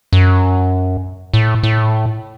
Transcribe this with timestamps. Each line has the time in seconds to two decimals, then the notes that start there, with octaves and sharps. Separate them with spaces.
0.13 F#2
1.34 A2
1.63 A2